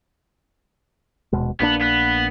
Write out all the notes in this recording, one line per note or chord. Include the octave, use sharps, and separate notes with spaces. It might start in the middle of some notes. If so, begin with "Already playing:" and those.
D#1 B2 G#3
A#1 A#3 B3 D4
B3